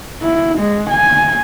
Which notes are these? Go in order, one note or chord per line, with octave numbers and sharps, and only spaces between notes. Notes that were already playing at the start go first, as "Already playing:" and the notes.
E4
G#3
G#5